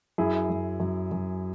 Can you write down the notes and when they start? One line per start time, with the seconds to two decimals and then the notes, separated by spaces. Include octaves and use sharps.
0.18 F#2 E4 G#4
0.50 F#2
0.80 F#2
1.12 F#2